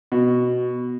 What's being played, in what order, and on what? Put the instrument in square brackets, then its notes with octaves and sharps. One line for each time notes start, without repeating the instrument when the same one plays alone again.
[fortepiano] B2